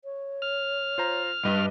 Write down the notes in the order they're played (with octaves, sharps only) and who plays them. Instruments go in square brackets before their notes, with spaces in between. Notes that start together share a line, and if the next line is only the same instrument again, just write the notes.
[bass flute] C#5
[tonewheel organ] F6
[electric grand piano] F4 C5 A#5
[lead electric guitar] G2 [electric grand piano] B4 D#5